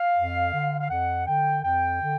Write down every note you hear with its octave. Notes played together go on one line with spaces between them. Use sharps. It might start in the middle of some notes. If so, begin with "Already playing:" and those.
Already playing: F5
F2
D3
F5
F2 F#5
D3 G5
F2 G5
D3